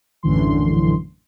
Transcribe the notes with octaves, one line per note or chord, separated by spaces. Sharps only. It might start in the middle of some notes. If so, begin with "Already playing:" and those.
A#1 F#2 A2 D3 E3 C6